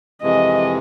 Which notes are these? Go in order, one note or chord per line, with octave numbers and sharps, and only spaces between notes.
F2 C3 E3 G#3 D#5